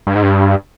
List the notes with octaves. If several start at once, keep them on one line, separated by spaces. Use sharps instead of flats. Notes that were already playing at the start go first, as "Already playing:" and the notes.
G2
G#2
G2